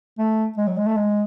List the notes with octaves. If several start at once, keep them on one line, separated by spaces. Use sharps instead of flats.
A3
G#3
F#3
G#3
A3
G#3